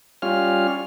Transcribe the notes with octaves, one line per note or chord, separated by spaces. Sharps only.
G3 C#4 F4 F6